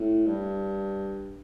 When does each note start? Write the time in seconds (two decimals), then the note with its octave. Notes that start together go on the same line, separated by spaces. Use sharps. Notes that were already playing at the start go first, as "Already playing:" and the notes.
Already playing: A2
0.26 G2